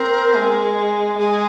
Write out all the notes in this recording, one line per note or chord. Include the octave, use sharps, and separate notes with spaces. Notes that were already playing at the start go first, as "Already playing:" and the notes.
Already playing: C4 A#4
G#3
G#3 G#4